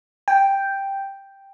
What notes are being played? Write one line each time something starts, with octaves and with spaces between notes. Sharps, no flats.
G5